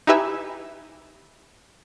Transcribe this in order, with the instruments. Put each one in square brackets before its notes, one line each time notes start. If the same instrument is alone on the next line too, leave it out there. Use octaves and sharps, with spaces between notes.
[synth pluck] D#4 E4 G4 B4 E5 G#5